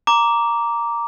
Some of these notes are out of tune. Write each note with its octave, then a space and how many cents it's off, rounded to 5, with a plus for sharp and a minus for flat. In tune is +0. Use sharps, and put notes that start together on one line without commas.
A#5 +0 D6 -10